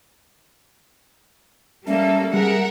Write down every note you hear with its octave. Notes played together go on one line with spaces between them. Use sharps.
G3 A#3 C#4 A4 E5
G3 G#4 A#4 E5 F#5